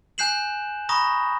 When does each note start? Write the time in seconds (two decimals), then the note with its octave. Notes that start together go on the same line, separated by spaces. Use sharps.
0.18 G#5 F#6 G6 C7 E7 F#7
0.89 A#5 B5 C#6 D#6 A#6